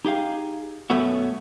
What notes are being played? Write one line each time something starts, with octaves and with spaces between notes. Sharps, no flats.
D#4 G4 G#4 F5
F#2 B2 A3 B3 C#4 F#4